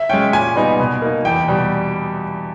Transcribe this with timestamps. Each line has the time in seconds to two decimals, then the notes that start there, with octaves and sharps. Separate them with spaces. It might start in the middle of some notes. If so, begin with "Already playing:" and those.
Already playing: E5
0.09 G#3 C#4 G5
0.33 A#2 G#5
0.56 G3 B3 D#4
0.79 B2
1.02 A#3 D#4
1.25 E2 G5
1.48 B2 G3